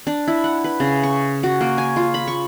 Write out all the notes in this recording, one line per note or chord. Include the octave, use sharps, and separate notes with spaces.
D4
E4
F#5
B4
C#3
C#6
F#4
A#3
G#5
F4
B5
C#6